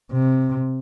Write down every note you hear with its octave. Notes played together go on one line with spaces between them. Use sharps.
C3